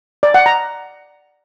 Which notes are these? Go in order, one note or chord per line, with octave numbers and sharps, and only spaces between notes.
D5
F#5
A#5